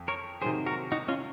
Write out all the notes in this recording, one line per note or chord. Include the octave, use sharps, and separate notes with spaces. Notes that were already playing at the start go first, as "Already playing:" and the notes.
Already playing: F2
A#4 C#5
C3 D#3 F#3 G#4 C5
F#4 A#4
D#4 F#4
C#4 F4